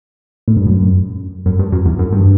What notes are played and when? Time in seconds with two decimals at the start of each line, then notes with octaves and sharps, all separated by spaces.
0.48 A2
0.57 G2
0.66 F#2
1.46 F#2
1.59 G2
1.72 F#2
1.86 E2
1.99 F#2
2.13 G2